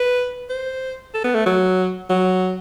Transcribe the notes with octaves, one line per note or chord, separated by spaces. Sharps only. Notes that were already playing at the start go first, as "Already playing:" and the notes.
Already playing: B4
C5
A4
B3
A3
F#3
F#3